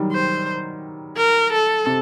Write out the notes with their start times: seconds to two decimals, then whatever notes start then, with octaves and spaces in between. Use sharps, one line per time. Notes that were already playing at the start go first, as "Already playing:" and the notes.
Already playing: D#3 F#3 G3
0.13 C5
1.17 A#4
1.52 A4
1.86 C3